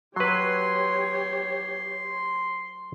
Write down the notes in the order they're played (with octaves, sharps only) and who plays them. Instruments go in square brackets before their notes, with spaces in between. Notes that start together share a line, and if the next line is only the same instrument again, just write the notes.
[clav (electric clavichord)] F#3 B4 [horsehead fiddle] G4 C#5 [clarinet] C6